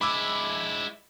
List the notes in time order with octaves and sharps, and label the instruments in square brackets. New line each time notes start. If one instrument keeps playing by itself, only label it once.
[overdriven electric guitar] G#3 E4 [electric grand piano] B5 D6 E6